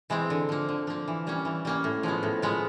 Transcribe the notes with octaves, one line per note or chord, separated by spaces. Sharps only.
E3 G#3 C4
D3
F3 A#3
D3
F3 A#3
E3
G3 A#3 C#4
E3
G3 A#3 C#4
A2
F3 G#3 B3
A2
F3 G#3 B3